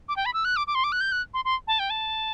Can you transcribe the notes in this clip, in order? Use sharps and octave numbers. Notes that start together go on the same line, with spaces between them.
D6
G5
B5
E6
F#6
D6
D6
C6
D6
F#6
G6
F#6
C6
C6
A5
G5
A5